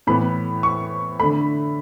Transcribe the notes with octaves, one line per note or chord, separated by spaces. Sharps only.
A2 E3 B3 B5
C#6
D3 A3 B5